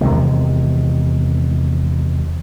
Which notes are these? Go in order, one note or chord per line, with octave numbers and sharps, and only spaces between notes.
E2 C3 D#3 G#3